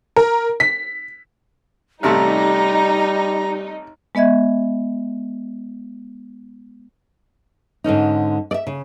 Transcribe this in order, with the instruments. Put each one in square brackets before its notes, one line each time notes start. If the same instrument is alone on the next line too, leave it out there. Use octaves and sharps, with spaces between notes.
[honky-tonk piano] A#4
B6
[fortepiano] A1 C3 A3 [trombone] G3 [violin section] D#4 [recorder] A#5
[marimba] G#3 B3 D#5 E5 G#6
[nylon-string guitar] G#2 D3 C#4 D#4
D5 E5
C#3